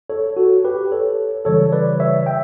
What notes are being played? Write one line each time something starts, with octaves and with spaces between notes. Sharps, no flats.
A4 C#5
F#4 A4
G4 B4
A4 C#5
C#3 E3 G3 A4 C#5
B4 D5
C#5 E5
E5 G5